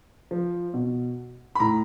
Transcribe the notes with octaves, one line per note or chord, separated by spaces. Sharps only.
F3
B2
B5
A2 A#5